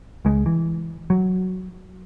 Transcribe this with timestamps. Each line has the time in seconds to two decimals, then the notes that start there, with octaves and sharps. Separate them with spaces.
0.25 C#2 G#3
0.46 E3
1.10 F#3